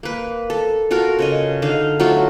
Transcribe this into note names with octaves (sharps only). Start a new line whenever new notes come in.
A#3 B4
A4
F4 F#4 A4 A#4
C#3 C#5 D#5
D3 D#4 F5
F#3 A3 F4 F#4